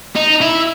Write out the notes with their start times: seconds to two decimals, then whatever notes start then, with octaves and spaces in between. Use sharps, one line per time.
0.15 D#4
0.41 E4